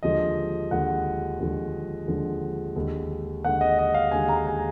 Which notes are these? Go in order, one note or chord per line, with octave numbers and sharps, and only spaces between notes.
D#2 D3 F3 G#3 D#5
D#2 D3 F3 G#3 F#5
D#2 D3 F3 G#3
D#2 D3 F3 G#3
D#2 D3 G#3
D#2 D3 G#3 F#5
D#5
D#5
F5
D#2 D3 G#3 G#5
A#5
G#5